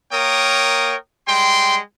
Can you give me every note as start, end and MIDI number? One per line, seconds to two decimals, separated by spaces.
0.12 0.96 58
0.12 0.96 70
0.12 0.96 73
0.12 0.96 79
0.12 0.96 87
1.28 1.79 55
1.28 1.79 56
1.28 1.79 79
1.28 1.79 84